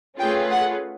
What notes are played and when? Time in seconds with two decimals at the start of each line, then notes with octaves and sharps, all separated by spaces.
0.18 A3 C#4 F4 G#4 B4 G5
0.51 F#5